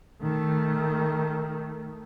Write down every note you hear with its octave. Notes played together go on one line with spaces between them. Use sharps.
D#3 A3